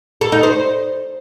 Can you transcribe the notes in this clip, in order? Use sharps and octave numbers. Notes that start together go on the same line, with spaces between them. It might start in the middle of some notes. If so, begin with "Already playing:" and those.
A4
D#4
C5